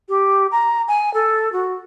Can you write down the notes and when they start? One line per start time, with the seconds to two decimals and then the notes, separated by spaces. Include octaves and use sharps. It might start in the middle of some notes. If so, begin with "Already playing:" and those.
0.09 G4
0.52 A#5
0.88 G#5
1.14 A4
1.53 F#4